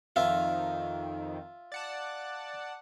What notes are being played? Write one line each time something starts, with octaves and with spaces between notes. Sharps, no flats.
F2 D#3 F4 E5
D5 F#5 A5